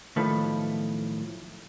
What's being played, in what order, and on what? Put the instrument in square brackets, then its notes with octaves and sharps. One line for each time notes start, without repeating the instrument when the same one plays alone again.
[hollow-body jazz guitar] B1 A2 D#3 F3 A3 B4